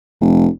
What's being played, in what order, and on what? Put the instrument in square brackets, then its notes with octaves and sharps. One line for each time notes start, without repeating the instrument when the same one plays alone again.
[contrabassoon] F1